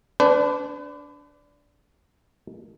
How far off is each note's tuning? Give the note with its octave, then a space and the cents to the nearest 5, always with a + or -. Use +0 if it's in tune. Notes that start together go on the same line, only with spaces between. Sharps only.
D4 -15 B4 +40